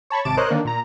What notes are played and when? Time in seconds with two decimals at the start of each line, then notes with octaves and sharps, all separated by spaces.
0.10 C#5 A5 B5 C#6
0.25 G#1 C3 A5 D6 D7 E7
0.37 A#4 C5 C#5 D#5 F#6
0.50 D3 D#3 A#3 D4
0.65 A#2 A#5